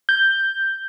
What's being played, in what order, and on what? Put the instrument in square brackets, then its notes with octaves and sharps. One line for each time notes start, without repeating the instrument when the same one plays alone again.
[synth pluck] G6